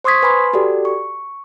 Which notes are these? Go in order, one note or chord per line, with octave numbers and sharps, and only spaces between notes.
C5 C6 C#6 D#6 G#6 B6
B4 G#5 B5 C6
F#4 G4 A4 D5
C#6